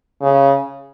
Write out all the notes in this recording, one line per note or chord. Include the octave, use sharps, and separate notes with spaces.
C#3